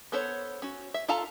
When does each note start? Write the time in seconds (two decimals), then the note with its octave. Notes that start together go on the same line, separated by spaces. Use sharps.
0.12 B3 A4 C5 C#5
0.62 C#4 F#4
0.94 E5
1.08 F4 A4 F5 A5 A#5